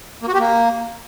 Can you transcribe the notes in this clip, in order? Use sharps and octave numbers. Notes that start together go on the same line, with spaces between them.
A#3
F#4
G4
A#3